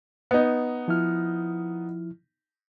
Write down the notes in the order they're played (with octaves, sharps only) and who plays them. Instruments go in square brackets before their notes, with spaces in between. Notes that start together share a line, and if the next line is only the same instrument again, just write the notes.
[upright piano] B3 D#4
[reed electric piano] F3 E4 F6